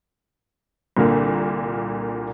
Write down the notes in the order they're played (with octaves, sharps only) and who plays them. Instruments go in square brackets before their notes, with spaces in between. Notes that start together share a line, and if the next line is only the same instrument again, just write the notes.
[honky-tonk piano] C2 A#2 D3 A#3